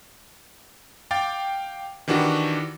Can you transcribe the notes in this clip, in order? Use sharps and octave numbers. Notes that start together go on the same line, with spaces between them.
F5 G5 D6 A6
D#3 E3 D4 F#4 G4